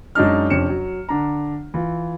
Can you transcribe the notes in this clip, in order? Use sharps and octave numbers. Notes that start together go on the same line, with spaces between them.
F#2 G#3 D4 D#4 F6
F2 C3 C#4 D4 C#7 E7
F#3
D3 D4 A#5
E3 F4